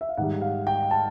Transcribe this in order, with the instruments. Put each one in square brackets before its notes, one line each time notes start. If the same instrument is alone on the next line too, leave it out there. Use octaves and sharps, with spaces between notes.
[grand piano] E5
F5
G#2 D#3 G3 F#5
F5
G5
A5